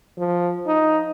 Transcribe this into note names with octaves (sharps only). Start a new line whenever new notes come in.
F3
D#4